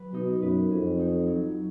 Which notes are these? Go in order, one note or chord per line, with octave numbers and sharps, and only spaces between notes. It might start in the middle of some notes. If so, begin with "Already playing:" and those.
Already playing: F#3 G#3 B4
B2 D#4
F#2 B4
F2 C#4
D#4
F#3